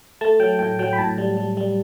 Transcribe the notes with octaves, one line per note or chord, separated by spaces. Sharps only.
A3 A5
F#3 G5
A2 G5
F#3 G5
B5
A2 A5
G3
G3
G3